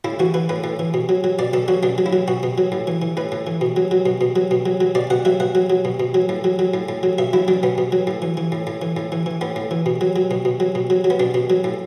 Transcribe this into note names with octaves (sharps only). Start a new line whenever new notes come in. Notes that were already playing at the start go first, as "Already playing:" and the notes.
A2 E4
E3 F#4
E3 B4
A2 B4
A2
E3
B2
F#3
F#3
B2 D5
B2 A4
F#3 F#4
B2 D4
F#3
E4
F#3
B2 F#4
B2
F#3
A2
E3
E3
A2 B4
A2
E3
B2
F#3
F#3
B2
B2
F#3
B2
F#3
F#3
B2 D5
B2 F#5
F#3 E5
B2 F#5
F#3
F#3
B2
B2
F#3
A2
F#3
F#3
A2
A2
F#3
B2 E5
F#3 E4
F#3 D4
B2 B3
B2
F#3
A2
E3
E3
A2
A2
E3
A2
E3
E3
A2 B3
A2
E3
B2
F#3
F#3
B2
B2
F#3
B2
F#3
F#3
B3
B2 D4
B2
F#3
A2